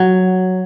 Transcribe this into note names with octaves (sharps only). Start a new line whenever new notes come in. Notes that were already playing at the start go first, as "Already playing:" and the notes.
Already playing: F#3